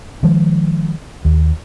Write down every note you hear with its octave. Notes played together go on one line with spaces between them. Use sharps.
D#3 F3 G#3
D#2